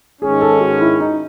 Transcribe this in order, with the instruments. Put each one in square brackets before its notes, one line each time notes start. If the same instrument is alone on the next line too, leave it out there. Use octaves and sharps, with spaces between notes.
[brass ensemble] G#2 D#3 G#3 C#4 [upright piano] G#4
[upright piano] A4
F#4
E4
D#4